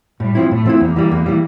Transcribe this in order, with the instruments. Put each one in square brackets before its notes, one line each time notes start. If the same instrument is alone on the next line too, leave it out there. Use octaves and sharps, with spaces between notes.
[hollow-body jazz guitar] A2 [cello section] G3
[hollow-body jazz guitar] F3 C4 E4
[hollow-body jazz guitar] A2 [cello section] A3
[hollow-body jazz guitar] F3 C4 E4
[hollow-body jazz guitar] E2 [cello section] A#3
[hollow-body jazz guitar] E3 G3
E2
E3 G3